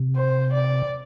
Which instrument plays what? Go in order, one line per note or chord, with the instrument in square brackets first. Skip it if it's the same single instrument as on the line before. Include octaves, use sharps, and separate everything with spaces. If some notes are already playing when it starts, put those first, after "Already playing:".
Already playing: [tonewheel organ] C3
[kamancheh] C5
D5